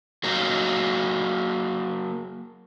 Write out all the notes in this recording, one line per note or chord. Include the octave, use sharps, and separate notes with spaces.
F#3 A#3 D#4